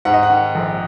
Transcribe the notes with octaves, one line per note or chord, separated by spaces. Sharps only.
G#2 F#5
D#5
F#5
D#3
A#1